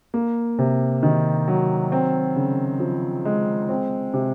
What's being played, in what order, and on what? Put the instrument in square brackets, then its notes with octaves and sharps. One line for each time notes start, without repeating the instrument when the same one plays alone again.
[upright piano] A#3
C3
D#3
F#3
C4
C#3
F3
G#3
C4
C3